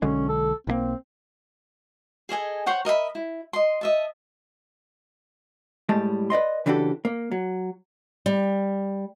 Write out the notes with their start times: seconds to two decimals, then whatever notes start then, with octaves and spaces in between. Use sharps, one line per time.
0.02 B1 D3 G#3 C#4
0.29 A4
0.67 B1 E3 A#3 C4
2.29 G#4 A4 D#5 G#5
2.66 C5 C#5 F#5 G5
2.85 A#4 D#5 E5 B5
3.15 E4
3.53 D#5 C6
3.81 D#5 E5 A5
5.89 A2 G3 G#3 A5
6.30 B4 D5 D#5 C6
6.66 C#3 E3 D4 F#4 G4 A4
7.05 A#3
7.32 F#3
8.26 G3